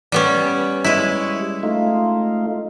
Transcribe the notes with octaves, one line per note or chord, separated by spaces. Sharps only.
G3 B3 C#4
G3 G#3 E4 C#5
A3 D#4 F4